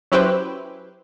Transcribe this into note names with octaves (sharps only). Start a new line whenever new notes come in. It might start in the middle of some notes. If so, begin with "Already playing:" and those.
F#3 C#4 E4 G4 B4 C5